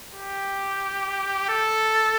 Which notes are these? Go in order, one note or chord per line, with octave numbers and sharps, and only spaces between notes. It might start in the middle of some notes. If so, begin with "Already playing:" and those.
G4
A4